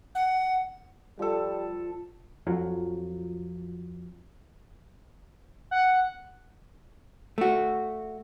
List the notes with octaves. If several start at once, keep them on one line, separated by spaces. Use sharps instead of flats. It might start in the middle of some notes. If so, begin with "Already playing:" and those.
F#5
F3 G3 A4
F2 F3 F#3
F#5
A3 F#4